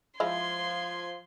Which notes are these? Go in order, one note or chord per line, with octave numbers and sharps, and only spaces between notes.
F3 G#3 E4 F4 C6 G#6